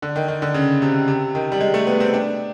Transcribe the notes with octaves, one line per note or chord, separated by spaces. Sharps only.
D3
D#3
D#3
D3
C#3
C3
C3
D#3
G3
G#3
A3
B3
C4
D4